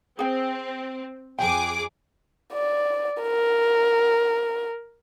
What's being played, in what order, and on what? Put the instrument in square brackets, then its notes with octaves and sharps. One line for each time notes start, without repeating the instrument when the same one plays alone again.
[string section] C4 [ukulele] G#4 G5
[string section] F2 G#4 D6 [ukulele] G5
[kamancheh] D5
A#4